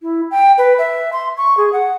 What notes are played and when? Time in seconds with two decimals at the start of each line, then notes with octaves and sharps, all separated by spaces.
0.02 E4
0.31 G5
0.58 B4
0.79 E5
1.13 C6
1.37 C#6
1.57 G#4
1.73 F#5